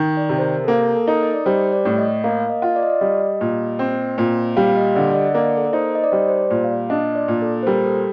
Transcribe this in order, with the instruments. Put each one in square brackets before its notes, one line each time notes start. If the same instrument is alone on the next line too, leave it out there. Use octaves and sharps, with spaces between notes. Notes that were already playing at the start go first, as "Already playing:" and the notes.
Already playing: [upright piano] D#3
[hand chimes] D5
[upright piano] C3
[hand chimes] C5
A#4
A4
[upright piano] A#3 [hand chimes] A#4
[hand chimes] A4
[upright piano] D#4 [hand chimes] A#4
[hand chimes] D#5
D5
[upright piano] G3 [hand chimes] C5
[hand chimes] D5
[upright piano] A2
[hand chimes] D#5
[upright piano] A#3 [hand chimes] F5
[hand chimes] F5
D#5
[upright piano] F4
[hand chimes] D5
D#5
D5
[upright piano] G3 [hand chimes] D#5
[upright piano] A#2
C4
A#2
[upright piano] G3 [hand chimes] F5
[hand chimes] F5
D#5
[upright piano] D3 [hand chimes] D5
[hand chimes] D5
D#5
[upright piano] A#3 [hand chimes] D5
[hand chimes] A4
A#4
[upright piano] D#4 [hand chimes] C5
[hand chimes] D#5
D5
[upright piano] G3 [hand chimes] C5
[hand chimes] C5
D5
[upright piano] A#2
[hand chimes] F5
[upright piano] D4 [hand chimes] D#5
[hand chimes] D5
[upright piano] A#2
[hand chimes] A4
C5
[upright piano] G3 [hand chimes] A#4
[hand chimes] A4